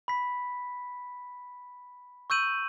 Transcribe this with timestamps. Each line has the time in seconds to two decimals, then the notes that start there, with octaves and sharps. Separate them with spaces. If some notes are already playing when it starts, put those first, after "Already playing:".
0.08 B5 B6
2.30 C#6 E6 G6 D#7 F#7